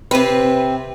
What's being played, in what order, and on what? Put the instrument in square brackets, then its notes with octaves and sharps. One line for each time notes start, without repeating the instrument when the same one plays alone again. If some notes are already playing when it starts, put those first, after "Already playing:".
[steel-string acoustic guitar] C3 C4 [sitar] B4